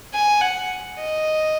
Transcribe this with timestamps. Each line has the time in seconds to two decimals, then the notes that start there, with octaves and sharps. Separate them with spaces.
0.13 G#5
0.41 F#5
0.98 D#5